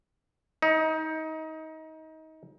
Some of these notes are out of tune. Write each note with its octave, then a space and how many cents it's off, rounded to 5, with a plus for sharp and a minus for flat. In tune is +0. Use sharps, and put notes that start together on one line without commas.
D#4 +25